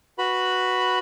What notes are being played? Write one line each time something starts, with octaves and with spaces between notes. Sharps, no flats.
F#4 B4 B5